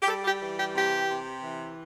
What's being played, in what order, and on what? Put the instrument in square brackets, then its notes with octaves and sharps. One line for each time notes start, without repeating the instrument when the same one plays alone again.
[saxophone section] G4
G3 A4
G4
E3
G4
C3 G4
C3
E3